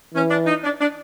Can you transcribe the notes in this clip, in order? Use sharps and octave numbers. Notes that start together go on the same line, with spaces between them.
E3 C#4
D4
D#4
D4
D4